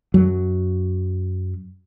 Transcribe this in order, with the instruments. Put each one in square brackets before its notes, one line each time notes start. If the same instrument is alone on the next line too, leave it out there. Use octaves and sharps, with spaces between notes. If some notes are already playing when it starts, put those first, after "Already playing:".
[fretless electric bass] F#2 F#3